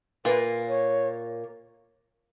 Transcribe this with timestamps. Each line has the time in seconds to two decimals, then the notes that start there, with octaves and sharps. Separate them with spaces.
0.25 A#2 A#3 B4
0.69 C#5